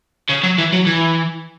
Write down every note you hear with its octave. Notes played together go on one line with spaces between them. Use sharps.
C#3
F#3
E3
F#3
E3